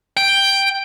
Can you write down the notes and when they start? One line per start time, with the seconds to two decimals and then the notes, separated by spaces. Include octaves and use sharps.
0.17 G5